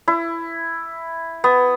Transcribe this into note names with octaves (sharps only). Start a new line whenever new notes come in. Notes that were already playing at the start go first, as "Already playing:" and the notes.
E4
B3